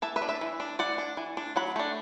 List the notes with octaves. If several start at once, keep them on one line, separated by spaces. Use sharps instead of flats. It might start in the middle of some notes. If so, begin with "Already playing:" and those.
E3 E5 A5
B4 E5
D4
B4 E5
E3
D4
E3 D5 F#5
D4
E3
D4
F#3 F#5 B5
A3 D4